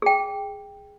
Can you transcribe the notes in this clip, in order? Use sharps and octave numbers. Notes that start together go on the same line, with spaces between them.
G#4 G5